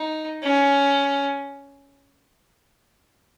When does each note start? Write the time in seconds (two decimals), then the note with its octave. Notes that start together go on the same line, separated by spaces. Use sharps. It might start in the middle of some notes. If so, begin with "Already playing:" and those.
Already playing: D#4
0.43 C#4